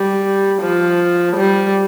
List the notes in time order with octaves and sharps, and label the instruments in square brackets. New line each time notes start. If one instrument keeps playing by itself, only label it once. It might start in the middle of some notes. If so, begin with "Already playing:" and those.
Already playing: [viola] G3
F3
G3